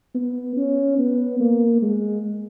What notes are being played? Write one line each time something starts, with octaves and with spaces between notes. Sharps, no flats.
B3
C#4
B3
A#3
G#3